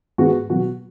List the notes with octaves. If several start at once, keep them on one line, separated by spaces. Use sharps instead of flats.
G#2 G#3 B3 F#4
B2 F#3 B3 F#4